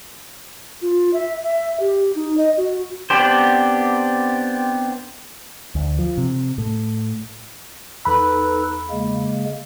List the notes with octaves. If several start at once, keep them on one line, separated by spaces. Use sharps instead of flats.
F4
E5
E5
G4
D#4
D#5
F#4
B3 C4 D4 G4 C5
D2
F3
C3
A2
E2 D#4 A4 B4 B5
C#3 G#3 A#3